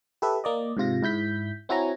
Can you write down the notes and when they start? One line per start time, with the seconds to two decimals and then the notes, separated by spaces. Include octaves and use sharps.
0.22 G4 A4 B4 E5
0.44 A#3 D5 D#5
0.77 G#2 C3 F4 A#6
1.03 G#2 E4 G6 B6
1.69 C4 E4 F#4 C#5 G#5 A#5